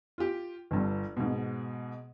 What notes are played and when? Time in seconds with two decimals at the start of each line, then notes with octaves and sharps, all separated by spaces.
0.18 F4 G4
0.71 G1 G2
1.17 G#2 B2